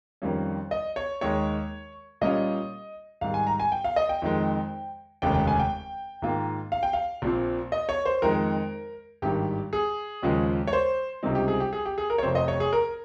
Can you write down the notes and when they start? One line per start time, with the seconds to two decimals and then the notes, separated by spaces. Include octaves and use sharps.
0.22 F2 D#3 G3 A#3 C#4
0.71 D#5
0.96 C#5
1.21 D#2 D#3 G#3 C#5
2.21 A#2 G3 C#4 F4 D#5
3.21 G#2 D#3 G3 F5
3.34 G#5
3.47 A#5
3.60 G#5
3.72 G5
3.84 F5
3.96 D#5
4.09 G5
4.22 F2 D#3 G#3
5.22 F1 D#2 C#3 G#3 G5
5.34 G5
5.47 G#5
5.60 G5
6.22 G#2 D#3 A#3 F4
6.72 F5
6.83 G5
6.93 F5
7.22 A#1 A#2 F3 C4
7.72 D#5
7.89 C#5
8.05 C5
8.22 F2 D#3 G#3 A#4
9.22 G#1 G2 D#3 G3 G4
9.73 G#4
10.22 D#2 C#3 F3 G#3
10.67 C#5
10.73 C5
11.23 C#2 C3 G3 C4 D#4
11.35 G4
11.48 G#4
11.60 G4
11.73 G#4
11.85 G4
11.98 G#4
12.10 A#4
12.18 C#5
12.23 F1 F2 C3 C5
12.35 D#5
12.48 C#5
12.60 G#4
12.73 A#4